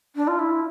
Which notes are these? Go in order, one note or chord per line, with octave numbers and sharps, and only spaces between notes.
D4
F4
E4